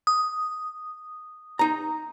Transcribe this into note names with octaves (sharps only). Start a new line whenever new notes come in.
D#6
D#4 A#5